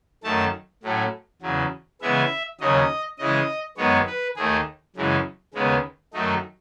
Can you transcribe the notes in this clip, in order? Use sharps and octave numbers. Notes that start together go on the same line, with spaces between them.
F#2 D#3 A3 A5
A2 F#3 A3 C#4
E2 C#3 F#3
C#3 E3 G#3 B3 E5
D#2 C#3 F#3 C#4 D#5
C#3 E3 G#3 D#5
F#2 D#3 G#3 B3 C#5
B4
D#2 D#3 A3 G#4
F#2 C#3 E3 G#3
D#2 C#3 G#3 B3
F#2 D#3 F#3 A3 D#4